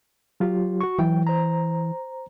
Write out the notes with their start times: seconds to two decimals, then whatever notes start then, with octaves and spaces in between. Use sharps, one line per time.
0.40 F#3 F4 G4
0.81 F#4 C#6
0.99 E3 F#3 G5
1.27 C5 A#5